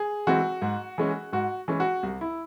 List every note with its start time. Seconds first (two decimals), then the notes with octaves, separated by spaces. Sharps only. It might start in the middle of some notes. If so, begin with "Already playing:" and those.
Already playing: G#4
0.27 E3 G#3 C4 F#4
0.62 G#2
0.98 E3 G#3 C#4
1.33 G#2 F#4
1.68 E3 G#3 C#4
1.80 F#4
2.03 C2
2.21 E4